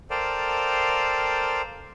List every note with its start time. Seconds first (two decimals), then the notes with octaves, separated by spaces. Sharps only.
0.10 A4 A#4 C5 D5 F5 G5